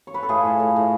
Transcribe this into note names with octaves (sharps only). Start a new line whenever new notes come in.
C#5
B4
A4
A2 F4 G#4
A2
A2
A2